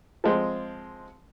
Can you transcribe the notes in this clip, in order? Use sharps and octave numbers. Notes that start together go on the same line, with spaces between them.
F3 G#3 C4